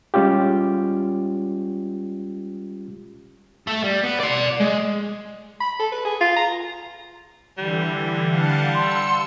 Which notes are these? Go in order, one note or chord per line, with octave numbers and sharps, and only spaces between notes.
G3 G#3 C#4 F4 G4
A4 E5
G3
B3
D5 C6
G#3
B5
A4
B4
G#4
F4
A#5
D3 E3 G3
F5 F#5 A5
C6 E6 C#7